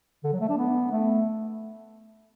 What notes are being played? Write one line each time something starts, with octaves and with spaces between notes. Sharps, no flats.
D3
F#3
A3
D4
B3
A3